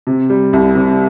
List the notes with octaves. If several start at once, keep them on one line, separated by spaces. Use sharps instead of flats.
C3
G3
C2
C3